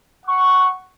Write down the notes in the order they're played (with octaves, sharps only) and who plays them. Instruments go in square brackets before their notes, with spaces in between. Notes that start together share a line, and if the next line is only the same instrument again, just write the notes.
[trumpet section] F#5 C#6